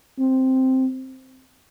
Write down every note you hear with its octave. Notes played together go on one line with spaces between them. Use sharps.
C4